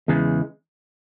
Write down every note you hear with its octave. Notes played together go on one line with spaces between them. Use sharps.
E2 C#3 E3 G#3